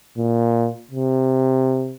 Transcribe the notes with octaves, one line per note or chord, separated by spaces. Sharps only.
A#2
C3